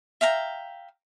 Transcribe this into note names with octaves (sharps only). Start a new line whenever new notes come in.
E5 F5 G5 A#5